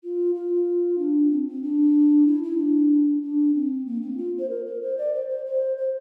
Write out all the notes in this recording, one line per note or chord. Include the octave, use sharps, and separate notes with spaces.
F4
F4
D4
C4
C4
D4
E4
E4
D4
D4
C4
A#3
C4
F4
C5
A#4
A#4
C5
D5
C5
C5
C5
C5